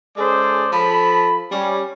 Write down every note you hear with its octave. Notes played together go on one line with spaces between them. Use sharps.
G#3 C#4 G#4 A4 C5 D5
F3 A4 A5 B5
G3 C#4